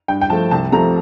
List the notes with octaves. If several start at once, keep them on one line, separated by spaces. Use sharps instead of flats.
G2 G5
G5
F3 A3 A5
C2 A5
C3 F3 A3 A#5